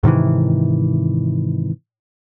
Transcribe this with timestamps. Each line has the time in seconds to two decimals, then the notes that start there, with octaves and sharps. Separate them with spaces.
0.03 G#2 C3 D#3 E3